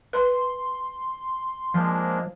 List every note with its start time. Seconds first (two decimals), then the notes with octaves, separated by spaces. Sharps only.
0.13 B4 C6
1.74 F3 G#3 A#3 D4